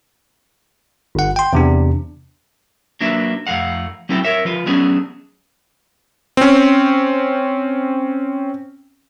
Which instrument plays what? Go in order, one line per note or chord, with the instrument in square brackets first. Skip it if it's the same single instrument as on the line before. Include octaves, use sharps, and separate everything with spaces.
[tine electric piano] G1 F#5
G5 C6
E2 C3 D4
[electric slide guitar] F#3 A#3 D4 B4 E5
F2 A3 F5 F#5
F#3 A3 C4 E4 A4 G5
A#4 C#5 E5
F3 F4 B4
F#3 A3 B3 C#4 D4 G#4
[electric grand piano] C4 C#4